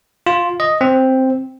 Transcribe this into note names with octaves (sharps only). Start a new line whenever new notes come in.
F4
D#5
C4